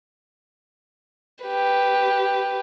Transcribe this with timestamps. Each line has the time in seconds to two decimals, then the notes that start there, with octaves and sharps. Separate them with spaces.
1.45 G4 B4